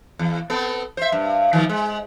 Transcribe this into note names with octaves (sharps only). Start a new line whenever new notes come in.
E2
B3 C4 A4
C5 E5
G2
D#3 F3 G3
G#3